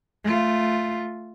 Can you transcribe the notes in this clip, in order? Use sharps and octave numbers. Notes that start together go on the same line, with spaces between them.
A3 F4